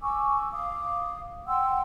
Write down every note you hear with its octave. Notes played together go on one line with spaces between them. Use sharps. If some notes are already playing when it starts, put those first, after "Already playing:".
G#5 C#6 D6 E6
F5 D6 D#6
F#5 G5 C6 E6